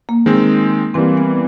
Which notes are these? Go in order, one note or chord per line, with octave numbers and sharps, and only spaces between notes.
A#3
D#3 G#3 C4
E3 G3 A#3 C4
B3